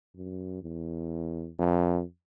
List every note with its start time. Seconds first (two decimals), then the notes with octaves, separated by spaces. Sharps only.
0.16 F#2
0.63 E2
1.59 F2